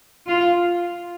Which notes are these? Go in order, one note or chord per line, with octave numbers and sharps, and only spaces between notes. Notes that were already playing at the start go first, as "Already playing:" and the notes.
F4